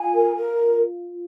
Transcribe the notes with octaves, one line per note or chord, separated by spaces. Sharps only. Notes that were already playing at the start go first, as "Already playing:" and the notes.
Already playing: F4 G#5
A#4
A#4